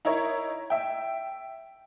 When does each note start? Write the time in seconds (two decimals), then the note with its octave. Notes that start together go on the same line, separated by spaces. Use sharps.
0.05 D#4 E4 A#4 C#5 E5
0.70 E5 G5